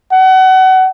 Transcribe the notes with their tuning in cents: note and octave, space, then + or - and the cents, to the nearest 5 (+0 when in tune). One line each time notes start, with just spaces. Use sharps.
F#5 +30